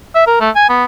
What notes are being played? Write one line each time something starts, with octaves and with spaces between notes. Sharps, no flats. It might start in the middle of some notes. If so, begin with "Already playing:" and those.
E5
A#4
A3
G#5
B3